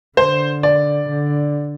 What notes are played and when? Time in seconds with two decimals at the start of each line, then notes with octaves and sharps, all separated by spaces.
0.17 D3 C5
0.63 D5
1.08 D3